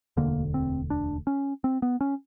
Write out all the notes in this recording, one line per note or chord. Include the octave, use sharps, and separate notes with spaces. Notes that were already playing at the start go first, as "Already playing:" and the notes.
E1 D2 D3 A#3
C4
D4
C#4
C4
B3
C#4